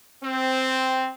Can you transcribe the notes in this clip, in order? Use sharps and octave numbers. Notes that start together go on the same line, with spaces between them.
C4